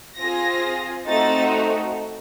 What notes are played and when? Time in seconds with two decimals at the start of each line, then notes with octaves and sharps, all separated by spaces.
0.18 C4 F4 G#4 A#6
1.07 A3 C4 D#4 F#4 A6